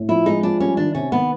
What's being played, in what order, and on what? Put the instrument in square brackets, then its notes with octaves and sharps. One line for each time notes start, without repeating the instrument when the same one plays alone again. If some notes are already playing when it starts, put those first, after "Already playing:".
Already playing: [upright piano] A2
[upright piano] F3 [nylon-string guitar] E4
[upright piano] G#3 [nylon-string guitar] D#4
[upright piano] F3 [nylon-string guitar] D4
[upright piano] G3 [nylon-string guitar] C#4
[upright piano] D#3 [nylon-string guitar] D4
[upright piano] C3 [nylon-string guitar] C#4
[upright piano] D#3 [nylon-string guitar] B3